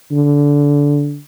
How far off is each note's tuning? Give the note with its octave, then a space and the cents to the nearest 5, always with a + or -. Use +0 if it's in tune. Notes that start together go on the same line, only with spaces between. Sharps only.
D3 -20